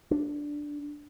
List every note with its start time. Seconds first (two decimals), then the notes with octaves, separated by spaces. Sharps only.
0.11 D4